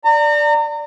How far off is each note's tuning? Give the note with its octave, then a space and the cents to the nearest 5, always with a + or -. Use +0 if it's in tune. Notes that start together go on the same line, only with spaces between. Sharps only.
D5 +0 A#5 -35